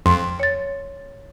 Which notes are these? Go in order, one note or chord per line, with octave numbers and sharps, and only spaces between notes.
F2 C6
C#5 A6